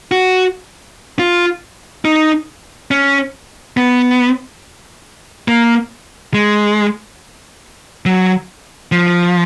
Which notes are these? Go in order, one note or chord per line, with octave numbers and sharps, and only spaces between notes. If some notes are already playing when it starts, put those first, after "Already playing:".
F#4
F4
D#4
C#4
B3
A#3
G#3
F#3
F3